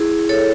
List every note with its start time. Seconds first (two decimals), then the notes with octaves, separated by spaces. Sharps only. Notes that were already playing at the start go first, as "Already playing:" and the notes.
Already playing: E4 G#4
0.29 A4 C#5